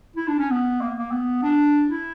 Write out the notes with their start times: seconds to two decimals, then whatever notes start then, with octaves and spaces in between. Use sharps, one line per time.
0.16 E4
0.28 D4
0.39 C#4
0.51 B3
0.81 A#3
0.97 A#3
1.11 B3
1.42 D4
1.89 E4